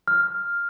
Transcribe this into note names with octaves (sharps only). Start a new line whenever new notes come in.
F6